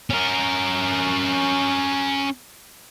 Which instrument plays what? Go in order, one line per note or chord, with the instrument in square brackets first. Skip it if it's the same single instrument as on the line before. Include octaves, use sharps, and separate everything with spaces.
[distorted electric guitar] C#4 A#4